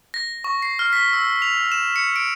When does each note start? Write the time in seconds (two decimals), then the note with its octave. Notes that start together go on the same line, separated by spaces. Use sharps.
0.14 A#6
0.44 C#6
0.62 C7
0.79 F6
0.93 B6
1.13 E6
1.42 F7
1.72 E7
1.96 C#7
2.16 D7